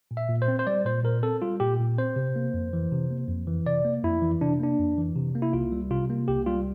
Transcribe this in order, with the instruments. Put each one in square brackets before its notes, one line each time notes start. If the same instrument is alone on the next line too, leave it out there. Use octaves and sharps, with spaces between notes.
[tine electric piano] A#2
E5
A#2
C5
C4
C5
G3 D5
A#2 C5
A#2 A#4
C4 A4
G3 F4
A#2 G4
A#2
C4 C5
C3
A#3
F2
E3
C3
A#3
F2
E3
C3 D5
A#3
F2 E4
E3
C3 D4
A#3 D4
F2
E3
C3
A#3
E4
C2 F4
G3
C3 F4
A#3
C2 G4
G3 F4